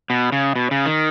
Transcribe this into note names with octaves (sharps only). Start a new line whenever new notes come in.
B2
C#3
B2
C#3
D#3